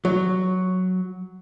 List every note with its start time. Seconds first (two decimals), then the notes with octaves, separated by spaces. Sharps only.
0.05 F#3